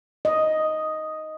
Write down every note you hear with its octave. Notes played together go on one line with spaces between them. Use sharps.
D#5